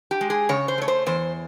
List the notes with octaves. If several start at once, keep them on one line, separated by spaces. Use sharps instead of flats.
G4
G#3
G#4
C#3 C#5
C5
A3 C#5
C5
E2 C5